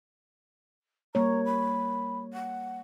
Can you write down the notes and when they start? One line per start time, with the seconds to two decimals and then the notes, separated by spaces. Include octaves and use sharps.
1.15 G3 A#3 C#5 A#5
1.45 B5
2.33 F#5